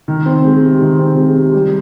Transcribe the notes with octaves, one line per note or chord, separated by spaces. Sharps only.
D#3
C4
G#3
C3
D#3
C4
G#3
C3
G3